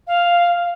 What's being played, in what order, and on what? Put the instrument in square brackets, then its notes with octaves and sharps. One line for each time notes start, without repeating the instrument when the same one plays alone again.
[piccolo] F5